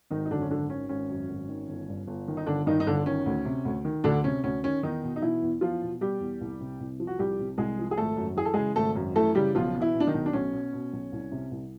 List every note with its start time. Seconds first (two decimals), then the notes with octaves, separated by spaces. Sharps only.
0.11 G#1 D#3 D#4
0.25 D#4
0.30 F#2 D3 D4
0.41 C#4
0.50 G#1 D3 D4
0.70 D#3 C#4
0.89 G#1 C#4
1.10 F#2
1.29 G#1
1.49 D#3
1.69 G1
1.89 G2
2.07 G1
2.28 D#3
2.37 D#4
2.46 G1 D3 D4
2.66 G2 D#3 D#4
2.80 D#4
2.86 G1 D3 D4
3.06 D#3 C#4
3.26 D2
3.45 C3
3.65 D2
3.85 D#3
4.04 D2 D3 D4
4.24 C3 C#4
4.44 D2 C#4
4.63 D#3 C#4
4.83 E2 D#3 D#4
5.03 B2
5.16 D#4
5.22 B2 E3 E4
5.42 E2
5.61 E2 F3 F4
5.82 B2
6.01 B2 G3 G4
6.20 E2
6.41 C2
6.60 C3
6.80 C2
7.00 F3
7.07 F#4
7.19 C2 G3 G4
7.39 C3
7.58 C2 G#3 G#4
7.79 F3
7.91 G#4
7.97 G#1 A3 A4
8.17 F#2
8.36 E3 G#4
8.45 A4
8.54 C#3 G#3 G#4
8.76 G#1 A3 A4
8.96 F#2
9.16 E3 A3 A4
9.35 C#3 G3 G4
9.55 B1 F3 F4
9.75 B2
9.81 E3 E4
9.95 B2
10.00 D4
10.07 D#3 D#4
10.14 B1
10.26 D4
10.33 B1 C#4
10.53 B2
10.73 B2
10.93 B1
11.12 C2
11.32 C3
11.51 C2